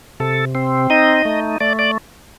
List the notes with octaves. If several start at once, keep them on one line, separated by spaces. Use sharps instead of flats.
C3 A4
C4
D#4 D#5
A3
A3 D5
D5